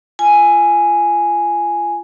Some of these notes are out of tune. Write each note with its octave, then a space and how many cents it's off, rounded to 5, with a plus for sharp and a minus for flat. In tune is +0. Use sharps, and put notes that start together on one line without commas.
F4 -25 G#5 +0